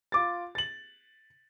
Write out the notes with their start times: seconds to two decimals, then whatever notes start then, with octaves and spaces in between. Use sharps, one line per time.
0.12 F4 D6 A6
0.55 A6 F#7